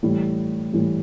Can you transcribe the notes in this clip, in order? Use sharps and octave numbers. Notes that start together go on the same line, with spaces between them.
A2 E3 G3
A2 E3 G3